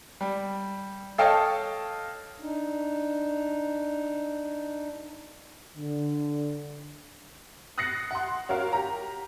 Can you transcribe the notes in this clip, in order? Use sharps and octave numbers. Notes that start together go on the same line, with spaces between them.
G3
A4 C#5 D#5 F5 G5 A5
D4 D#4
D3
D#6 F#6 A6 A#6 C7 C#7
F#5 C6
C#4 F#4 A#4 F5
G4 A#5